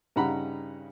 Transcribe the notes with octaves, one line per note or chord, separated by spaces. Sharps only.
G2 C#3 D#4 F#5 A#5 B5